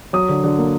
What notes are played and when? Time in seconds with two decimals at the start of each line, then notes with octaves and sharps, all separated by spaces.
0.13 F#3 D#6
0.29 D3
0.44 D3
0.59 A#3